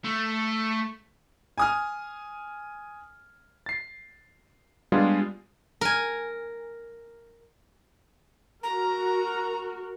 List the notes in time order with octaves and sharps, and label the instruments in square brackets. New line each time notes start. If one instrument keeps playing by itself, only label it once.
[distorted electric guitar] A3
[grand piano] G#5 D#6 F6
[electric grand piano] A6 C7
G3 G#3 B3 D4 F4 G#4
[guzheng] A#4 G#5
[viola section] F#4 A#4 [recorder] A#5